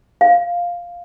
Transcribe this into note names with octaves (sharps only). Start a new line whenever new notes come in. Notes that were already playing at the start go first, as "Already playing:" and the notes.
F5